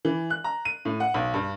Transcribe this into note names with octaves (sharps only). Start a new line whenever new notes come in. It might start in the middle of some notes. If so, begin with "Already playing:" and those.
E3
F#6
A#5
D#7
A2
F#5
B1
G2